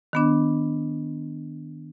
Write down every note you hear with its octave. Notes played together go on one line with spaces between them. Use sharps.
D#3 B3 D4